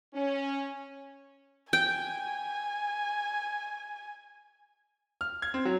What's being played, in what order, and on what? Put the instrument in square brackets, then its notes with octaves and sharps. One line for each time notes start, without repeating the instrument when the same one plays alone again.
[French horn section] C#4
[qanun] G5 [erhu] G#5
[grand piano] F6
G#6
C4
F#3